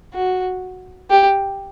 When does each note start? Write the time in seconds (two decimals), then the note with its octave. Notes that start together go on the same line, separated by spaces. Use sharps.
0.13 F#4
1.10 G4